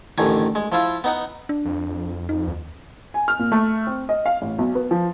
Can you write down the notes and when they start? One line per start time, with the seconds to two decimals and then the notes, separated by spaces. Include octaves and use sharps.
0.18 A1 D3 D#3 G#5
0.55 G#3
0.72 F3 E4 F4
1.04 B3 D#4 F#5
1.49 D4
1.65 F2
2.29 D#4
2.48 D#2
3.14 G#5
3.28 F6
3.39 A#2
3.52 A3
3.87 C4
4.09 D#5
4.26 F5
4.42 A1
4.59 B1
4.75 B3
4.91 F3